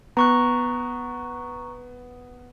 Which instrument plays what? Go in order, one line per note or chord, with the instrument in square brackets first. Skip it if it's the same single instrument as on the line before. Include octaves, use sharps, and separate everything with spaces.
[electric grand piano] B3 [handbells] A#5 C#6 F#6